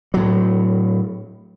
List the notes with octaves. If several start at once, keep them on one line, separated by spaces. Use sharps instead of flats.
A2 F#3